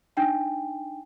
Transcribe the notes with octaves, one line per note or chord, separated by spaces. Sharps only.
D4 D#4 G5 G#5